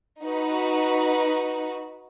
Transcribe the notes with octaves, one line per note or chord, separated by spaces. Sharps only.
D#4 F#4 B4